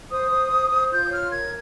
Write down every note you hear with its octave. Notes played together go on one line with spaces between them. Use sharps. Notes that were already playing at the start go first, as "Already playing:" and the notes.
C5 D#6
C5
C5
C5
F4 G6
D#6
C#5 F6
A#4 G#6